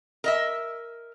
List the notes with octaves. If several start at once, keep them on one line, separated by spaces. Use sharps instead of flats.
A#4 D#5 E5